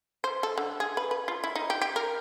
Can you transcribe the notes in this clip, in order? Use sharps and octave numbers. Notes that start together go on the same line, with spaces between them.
C5
A4
D3
G#4
B4
B4
F4
E4
D#4
G4
G4
A#4